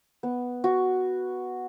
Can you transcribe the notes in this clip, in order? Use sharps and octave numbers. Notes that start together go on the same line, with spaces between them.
B3
F#4